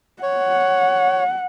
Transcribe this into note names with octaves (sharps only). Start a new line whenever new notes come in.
C#5 F#5